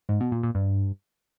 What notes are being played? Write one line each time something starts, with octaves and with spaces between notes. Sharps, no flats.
G#2
B2
A#2
A#2
G2